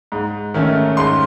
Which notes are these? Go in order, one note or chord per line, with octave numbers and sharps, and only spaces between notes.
G#2
D#3 A3 C#4
G#2 C6